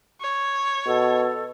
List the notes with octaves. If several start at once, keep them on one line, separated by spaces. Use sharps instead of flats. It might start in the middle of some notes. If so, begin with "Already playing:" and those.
C#5
B2 A4